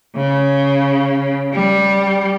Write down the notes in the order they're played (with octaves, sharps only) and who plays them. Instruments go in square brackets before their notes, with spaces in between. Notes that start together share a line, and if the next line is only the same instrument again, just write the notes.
[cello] C#3
G3